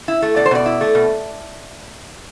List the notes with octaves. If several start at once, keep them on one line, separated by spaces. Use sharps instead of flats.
E4
A3
B2 D5
C5
B2 D5
E4
A3
B2